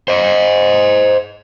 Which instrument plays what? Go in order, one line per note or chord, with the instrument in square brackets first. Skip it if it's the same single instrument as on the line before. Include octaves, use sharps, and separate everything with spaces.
[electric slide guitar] C5 D#5